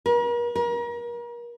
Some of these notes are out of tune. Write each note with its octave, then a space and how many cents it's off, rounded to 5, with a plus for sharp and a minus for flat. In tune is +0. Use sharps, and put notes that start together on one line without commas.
A#4 +45
A#4 +35